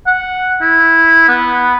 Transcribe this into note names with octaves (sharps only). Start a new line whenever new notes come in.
F#5
E4
B3